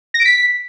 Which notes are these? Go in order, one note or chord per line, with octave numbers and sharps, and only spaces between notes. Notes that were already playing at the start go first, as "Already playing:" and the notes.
A#6
D7
B6